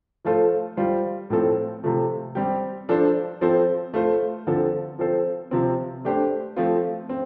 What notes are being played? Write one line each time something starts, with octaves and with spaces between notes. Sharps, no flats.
F3 A3 F4 A4 C5
G3 F4 C5
A2 F3 C4 A4
C3 F3 A3
G3 C4 G4
F3 D4 A4 C5
F3 C4 A4 C5
A3 F4 C5
D3 F3 C4 A4
F3 C4 A4 C5
C3 F3 C4
A3 D4 G4 C5
F3 A3 C4 F4
C4